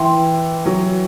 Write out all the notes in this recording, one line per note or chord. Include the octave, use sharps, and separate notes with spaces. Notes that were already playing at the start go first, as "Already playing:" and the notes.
Already playing: E3 B4 E5 G5 C6
F#3